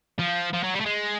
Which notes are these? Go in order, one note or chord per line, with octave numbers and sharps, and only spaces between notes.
F3
F3
F#3
G3
A3
G#3